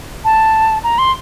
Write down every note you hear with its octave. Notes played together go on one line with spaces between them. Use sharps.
A5
A#5
C6